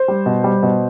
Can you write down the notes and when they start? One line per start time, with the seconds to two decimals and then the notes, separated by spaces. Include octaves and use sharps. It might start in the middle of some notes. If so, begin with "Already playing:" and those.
Already playing: C5
0.08 G3
0.26 B2
0.44 G3
0.63 B2